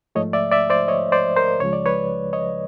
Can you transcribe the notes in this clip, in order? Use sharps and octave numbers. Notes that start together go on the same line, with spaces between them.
G#2 F3 A3 C#5 D#5
D5 E5
D5 E5
C5 D5
C#5 D#5
C5 D5
A#4 C5
C#2 C#3 F3 G#3 C#5
D5
B4 C#5
C#5 D#5